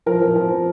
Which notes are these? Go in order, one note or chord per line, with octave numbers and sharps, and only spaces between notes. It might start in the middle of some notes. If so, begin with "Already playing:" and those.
F3 A#4
F3
F3